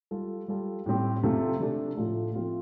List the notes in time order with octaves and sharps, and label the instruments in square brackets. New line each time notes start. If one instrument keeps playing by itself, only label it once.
[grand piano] G3 F4 A4
G3 F4 A4
A2 G3 C4 G4
C3 A3 C4 F4 A4
C3 A3 D4 A4
A2 F3 A3 F4 A4
F3 A3 C4 F4